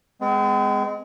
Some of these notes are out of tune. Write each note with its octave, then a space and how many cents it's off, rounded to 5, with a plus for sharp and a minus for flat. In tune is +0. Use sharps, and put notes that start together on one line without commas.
G#3 +0 C4 -45